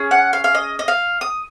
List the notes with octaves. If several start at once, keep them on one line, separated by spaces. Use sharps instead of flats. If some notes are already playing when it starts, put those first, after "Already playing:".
Already playing: C#4 G#4
F#5
F5
F5
D#5
D#5
F5
D#6